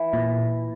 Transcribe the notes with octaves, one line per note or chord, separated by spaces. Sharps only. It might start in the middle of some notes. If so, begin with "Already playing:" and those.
Already playing: E3
A#2